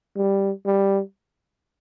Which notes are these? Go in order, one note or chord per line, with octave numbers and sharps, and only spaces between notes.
G3
G3